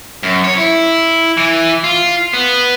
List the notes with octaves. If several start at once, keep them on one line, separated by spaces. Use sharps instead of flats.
F#2
C#5
E4
E3
F4
B3